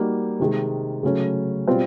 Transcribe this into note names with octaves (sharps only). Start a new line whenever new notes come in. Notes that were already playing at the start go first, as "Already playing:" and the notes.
Already playing: G3 A#3 D#4 F#4
C3 D#3 G#3
C#3 F#3 A3 C#4
B2 G3 C4 F4